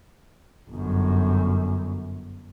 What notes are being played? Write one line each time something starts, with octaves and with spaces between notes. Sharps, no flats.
G1 F#2